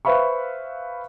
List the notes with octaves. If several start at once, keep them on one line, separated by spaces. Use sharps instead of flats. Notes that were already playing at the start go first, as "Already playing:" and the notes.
B4 C5 E5 F5 B5 C#6